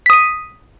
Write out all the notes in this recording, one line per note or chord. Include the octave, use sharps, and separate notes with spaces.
D#6 B6 D#7